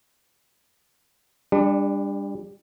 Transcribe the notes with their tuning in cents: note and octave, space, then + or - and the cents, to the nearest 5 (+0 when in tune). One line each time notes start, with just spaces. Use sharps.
G3 +30 D4 +0